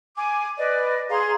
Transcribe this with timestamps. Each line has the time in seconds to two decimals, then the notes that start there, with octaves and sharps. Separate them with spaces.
0.16 G#5 D6
0.58 B4 D5 D#5
1.10 G#4 F5 A#5 C6